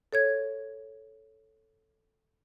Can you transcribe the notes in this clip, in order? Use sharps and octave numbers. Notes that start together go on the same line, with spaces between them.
A4 C#5 G#6